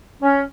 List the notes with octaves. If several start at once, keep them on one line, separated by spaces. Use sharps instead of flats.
C#4